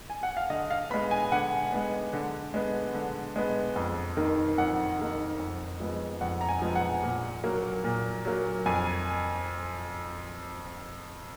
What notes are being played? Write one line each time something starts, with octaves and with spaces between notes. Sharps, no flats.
G#5
F#5
F5
D3 D#5
F5
G#3 B3 B5
G#5
D3 F#5
G#3 B3
D3
G#3 B3
D3
G#3 B3
F2
D#3 A#3
F2 F#5
D#3 A#3
F2
F3 G#3 B3
F2 F#5
A#5
G#5
F3 G#3 B3
F#5
A#2
F#3 A#3
A#2
F#3 A#3
F2 G#5